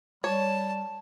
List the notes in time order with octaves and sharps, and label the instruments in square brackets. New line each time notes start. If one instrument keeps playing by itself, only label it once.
[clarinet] G3 [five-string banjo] C#5 [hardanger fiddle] A5